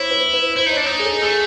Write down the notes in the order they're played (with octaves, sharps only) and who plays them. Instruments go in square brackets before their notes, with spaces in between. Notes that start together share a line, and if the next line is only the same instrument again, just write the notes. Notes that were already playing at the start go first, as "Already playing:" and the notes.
Already playing: [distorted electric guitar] E4 [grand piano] C5 C#5
[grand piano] B4
B4
[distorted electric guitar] E4 [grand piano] C5
[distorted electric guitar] D#4
[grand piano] C#5
[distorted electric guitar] D4
[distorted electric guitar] D#4 [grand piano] C#5
[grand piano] G#4
A4
[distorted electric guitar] A3 [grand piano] G#4